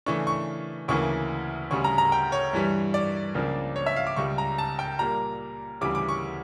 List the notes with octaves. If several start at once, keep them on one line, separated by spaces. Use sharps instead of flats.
C#3 E3 A3 D4 C#6
C#6
D2 C#3 E3 A#3 C#6
D2 C#3 G3 C#6
A#5
A#5
G5
C#5
G2 E3 G3
D5
C#2 C#3 F3 A#3 D4
C#5
E5
F5
D6
C#2 C#3 G3 C#6
A#5
A5
G5
A#2 G3 A#3 A#5
D2 C#3 E3 G3 D6
D6
C#6